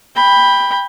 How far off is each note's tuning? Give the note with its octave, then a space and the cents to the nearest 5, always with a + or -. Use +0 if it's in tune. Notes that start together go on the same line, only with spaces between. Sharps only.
G5 +20 B5 +0